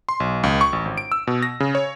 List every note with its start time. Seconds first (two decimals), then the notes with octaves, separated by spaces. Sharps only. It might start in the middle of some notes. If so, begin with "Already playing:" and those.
0.09 C6
0.20 B1
0.43 C#2
0.61 C#6
0.73 A1
0.85 G#1
0.98 D7
1.12 E6
1.27 B2
1.43 A#6
1.60 C#3
1.75 C#5